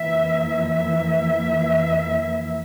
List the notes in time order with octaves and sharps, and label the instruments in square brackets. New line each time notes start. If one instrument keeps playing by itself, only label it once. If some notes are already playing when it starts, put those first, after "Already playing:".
Already playing: [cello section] F2 E3 A#3 E5
E5